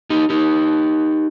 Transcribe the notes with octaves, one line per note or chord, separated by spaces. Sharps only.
D#4 G4
D#4 G4